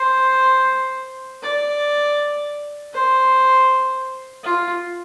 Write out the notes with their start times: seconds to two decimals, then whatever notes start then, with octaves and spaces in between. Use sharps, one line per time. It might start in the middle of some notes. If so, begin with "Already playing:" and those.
Already playing: C5
1.43 D5
2.93 C5
4.43 F4